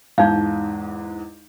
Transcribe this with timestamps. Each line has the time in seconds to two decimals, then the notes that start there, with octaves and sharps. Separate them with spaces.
0.18 E2 G#2 D#4 F5 G6